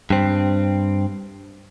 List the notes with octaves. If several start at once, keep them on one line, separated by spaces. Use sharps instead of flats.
G2 C4